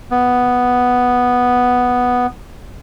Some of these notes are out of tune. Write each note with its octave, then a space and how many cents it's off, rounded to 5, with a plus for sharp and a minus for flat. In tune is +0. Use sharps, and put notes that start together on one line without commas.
B3 +0